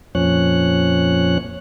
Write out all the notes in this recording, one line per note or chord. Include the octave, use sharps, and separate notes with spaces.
F2 A#2 F3 C#4 C#5 F#6